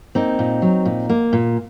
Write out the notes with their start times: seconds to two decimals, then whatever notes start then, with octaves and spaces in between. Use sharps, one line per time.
0.15 A#3 C4 D#4
0.39 A#2
0.62 F#3
0.85 A#2
1.10 A#3
1.33 A#2